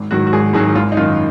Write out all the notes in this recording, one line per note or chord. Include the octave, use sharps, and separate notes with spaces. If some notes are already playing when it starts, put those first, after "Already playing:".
Already playing: G#1
G#2 D#3 F#3 F#4
F#4
G#1 G#4
G#2 D#3 F#3 G#4
G#1 F4
D#4
F#2 D#3 F4